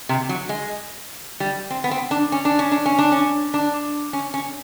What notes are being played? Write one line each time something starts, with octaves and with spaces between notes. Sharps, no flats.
C3
F#3
G#3
G3
C4
B3
C4
D4
C#4
D4
C#4
D4
C#4
D4
C#4
D4
C#4
C#4